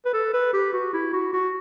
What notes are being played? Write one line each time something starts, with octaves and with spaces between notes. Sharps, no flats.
B4
A4
B4
G4
F#4
E4
F#4
F#4